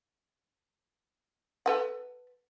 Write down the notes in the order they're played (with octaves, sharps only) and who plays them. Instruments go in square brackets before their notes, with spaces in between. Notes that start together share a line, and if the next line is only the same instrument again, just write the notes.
[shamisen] A4 B4 F#5